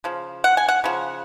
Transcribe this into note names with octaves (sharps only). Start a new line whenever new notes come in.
C#3 F3
F#5
G#5
F#5
C#3 F3